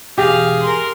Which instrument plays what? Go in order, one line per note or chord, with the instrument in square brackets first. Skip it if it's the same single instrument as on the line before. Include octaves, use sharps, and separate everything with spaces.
[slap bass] E1 G#2 [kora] G4 [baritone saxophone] G#4 [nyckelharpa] F5
[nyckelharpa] A#4 C6